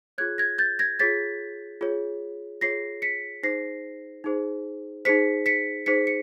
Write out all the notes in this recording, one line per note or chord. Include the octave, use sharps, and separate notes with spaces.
F4 G#4 C#5 F#6 G#6
G#6 A#6
G6 A6
G#6 A#6
F4 G#4 C#5 A6 B6
F4 G#4 C#5
F4 G#4 C#5 A#6 C7
B6 C#7
D#4 G#4 C5 A#6 C7
D#4 G#4 C5
D#4 G#4 C5 B6 C#7
B6 C#7
D#4 G#4 C5 B6 C#7
C#7